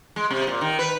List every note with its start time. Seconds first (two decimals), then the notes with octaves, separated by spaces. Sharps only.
0.16 G#3
0.31 C3
0.47 A#2
0.61 D#3
0.79 B4